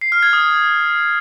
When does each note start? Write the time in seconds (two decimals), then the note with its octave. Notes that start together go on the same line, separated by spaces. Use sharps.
0.01 C7
0.12 F6
0.23 G#6
0.33 D#6